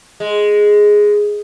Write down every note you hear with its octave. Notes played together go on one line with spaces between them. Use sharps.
G#3